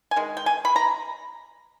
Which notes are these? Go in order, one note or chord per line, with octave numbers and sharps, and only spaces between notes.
G#5
D#3 G#3
G5
G#5
B5
A#5